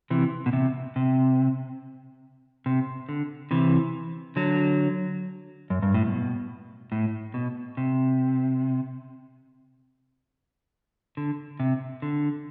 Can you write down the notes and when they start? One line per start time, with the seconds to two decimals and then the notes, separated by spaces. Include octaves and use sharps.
0.10 C3 E3
0.46 B2
0.53 C3
0.96 C3
2.66 C3
3.09 D3
3.51 C3 E3
4.36 D3 F#3
5.70 F#2
5.82 G2
5.94 A2
6.07 B2
6.92 A2
7.34 B2
7.77 C3
11.17 D3
11.60 C3
12.02 D3